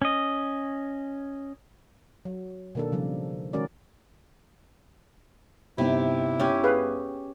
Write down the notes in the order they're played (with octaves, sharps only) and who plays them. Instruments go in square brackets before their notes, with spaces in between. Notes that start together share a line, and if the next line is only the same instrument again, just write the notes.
[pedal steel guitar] C#4 D#5
[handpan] F#3
B2 D#3 A#3 D4 A4
C#3 F3 G3
D#3 G#3 C#4 F#4 A#4 D5
[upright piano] G1 D#4 E5 [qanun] C3 [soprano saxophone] E4
[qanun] C#4 G4
[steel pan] G#4 B4 F5